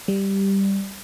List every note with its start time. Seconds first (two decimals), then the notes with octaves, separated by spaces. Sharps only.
0.08 G3